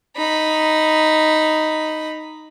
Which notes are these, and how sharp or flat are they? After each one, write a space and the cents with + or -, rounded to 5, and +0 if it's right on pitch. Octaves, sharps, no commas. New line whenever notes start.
D#4 +0 B5 +0